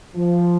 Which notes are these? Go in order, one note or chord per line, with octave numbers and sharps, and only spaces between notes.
F3